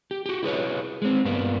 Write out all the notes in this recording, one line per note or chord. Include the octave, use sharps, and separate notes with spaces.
G4
F#4 G4
E4 G#4 B4 C#5
G#3 C4
G2 A#3 B3